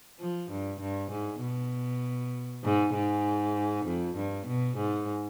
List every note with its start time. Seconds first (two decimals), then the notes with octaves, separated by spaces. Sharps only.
0.20 F3
0.51 G2
0.81 G2
1.11 G#2
1.41 B2
2.64 G#2
2.94 G#2
3.85 F2
4.16 G2
4.47 B2
4.77 G#2